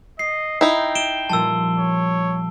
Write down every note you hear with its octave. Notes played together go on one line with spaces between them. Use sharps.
D#5 C7
D#4 E4 G5
D7 E7 G7
A#2 F3 G3 A5 E6
C#5